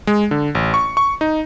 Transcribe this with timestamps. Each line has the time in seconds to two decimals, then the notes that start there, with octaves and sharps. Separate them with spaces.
0.07 G#3
0.31 D3
0.55 A1
0.74 C#6
0.97 C#6
1.21 D#4